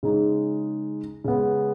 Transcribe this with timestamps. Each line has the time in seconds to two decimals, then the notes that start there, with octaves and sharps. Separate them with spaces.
0.03 C#3 G#3 D#4
1.24 C#3 G#3 B3